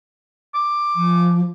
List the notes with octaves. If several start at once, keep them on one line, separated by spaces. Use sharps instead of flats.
D6
F3